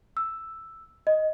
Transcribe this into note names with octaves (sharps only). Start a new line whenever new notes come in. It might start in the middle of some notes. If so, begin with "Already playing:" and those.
E6
D#5